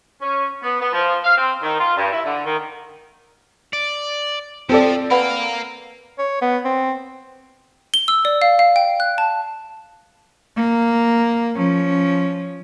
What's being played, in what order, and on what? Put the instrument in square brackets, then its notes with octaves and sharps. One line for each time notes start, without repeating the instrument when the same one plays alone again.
[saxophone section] C#4
B3
B3
F3
F5
C4
D#3
F4
G2
E4
D3
D#3
[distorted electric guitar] D5
[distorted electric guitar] F3 [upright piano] C4 A4 D5
[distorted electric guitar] A#4 F5 [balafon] B4 F#5 B5
[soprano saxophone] C#5
B3
C4
[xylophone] G7
E6
D5
F5
F5
G5
F#6
A5
[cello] A#3
F3 C#4